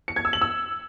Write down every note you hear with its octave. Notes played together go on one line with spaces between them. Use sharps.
C#7
G#6
E6
F#7
E6